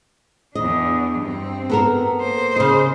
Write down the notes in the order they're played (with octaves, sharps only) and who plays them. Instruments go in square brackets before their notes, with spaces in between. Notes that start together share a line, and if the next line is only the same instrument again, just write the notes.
[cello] E2 D4 [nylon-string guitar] D#5
[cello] G2 C4
[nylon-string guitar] B3 A4 A#4
[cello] A#3 C5
[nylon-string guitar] C#3 D#5